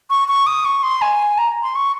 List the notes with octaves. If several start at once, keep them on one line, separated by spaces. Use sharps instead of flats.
C#6
C#6
D#6
C#6
C6
G#5
A#5
C6
C#6